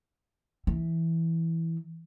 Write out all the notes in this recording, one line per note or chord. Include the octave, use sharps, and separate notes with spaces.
E3